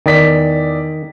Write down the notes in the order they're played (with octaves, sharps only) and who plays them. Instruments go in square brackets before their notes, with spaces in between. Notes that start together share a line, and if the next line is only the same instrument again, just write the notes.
[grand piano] E2 D5 B6 [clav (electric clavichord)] D#3